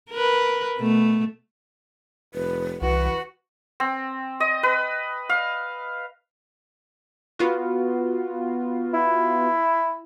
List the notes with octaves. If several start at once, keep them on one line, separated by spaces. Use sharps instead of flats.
A#4 B4
B2 A3
F1 B4
C2 E3 F#4 B4
C4
D#5
B4
F5
B3 F4 F#4
E4